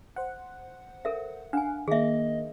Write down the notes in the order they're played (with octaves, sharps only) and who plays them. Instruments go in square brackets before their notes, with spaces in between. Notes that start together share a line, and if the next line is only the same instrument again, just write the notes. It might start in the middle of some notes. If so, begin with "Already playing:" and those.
[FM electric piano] C5 F#5
[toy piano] A4 A#4 E5
[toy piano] D4 G#5 [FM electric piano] F5 F#5
[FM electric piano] D#3 A#3 [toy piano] G#4 E5 [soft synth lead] D#5